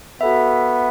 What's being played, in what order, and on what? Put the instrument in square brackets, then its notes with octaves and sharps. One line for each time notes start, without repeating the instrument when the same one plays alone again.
[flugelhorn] B3 [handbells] F#4 A4 E5